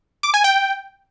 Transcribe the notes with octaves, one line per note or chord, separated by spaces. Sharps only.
D6
G#5
G5